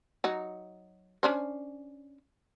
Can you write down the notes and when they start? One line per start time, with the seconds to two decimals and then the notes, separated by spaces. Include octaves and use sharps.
0.24 F#3 D#4
1.23 C#4 D4 C5